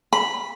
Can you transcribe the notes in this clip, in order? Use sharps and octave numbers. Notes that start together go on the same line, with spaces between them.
B5